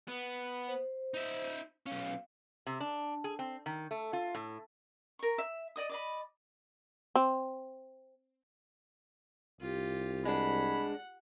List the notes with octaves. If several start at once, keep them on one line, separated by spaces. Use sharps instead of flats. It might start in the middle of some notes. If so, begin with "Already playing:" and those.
B3
C5
D#4 E5
B1 C#4 F5
C3
D4
G#4
C4
D#3
A3
F4
A2
A#4 C#6
E5
D5 D#5 D#6
D5 D#5 B5
C4
C2 F4 G4
G#3 D4 F#5 B5